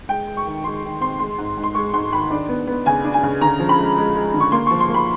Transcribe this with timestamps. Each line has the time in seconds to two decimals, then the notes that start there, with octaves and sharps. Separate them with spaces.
0.09 G#3 G5
0.27 G#3
0.37 C#6
0.45 D#3
0.64 G#3 C6
0.83 D#3
1.01 C4 C6
1.19 G#3 C6
1.38 G#2
1.57 G#2
1.64 C6
1.75 G#3 C#6
1.93 G#2 C6
2.12 D#3 B5
2.30 D4
2.49 B3
2.67 B3
2.86 C#3 G#5
3.04 D4
3.14 G#5
3.23 C#3
3.41 D3 A#5
3.60 F3
3.69 B5
3.78 G#3
3.97 G#3
4.15 G#3
4.34 D3
4.40 C#6
4.52 A#3 C6
4.67 F3 C#6
4.80 C6
4.89 A#3 B5